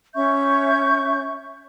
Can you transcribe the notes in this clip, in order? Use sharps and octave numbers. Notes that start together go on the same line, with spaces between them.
C#4 E5 C#6 G6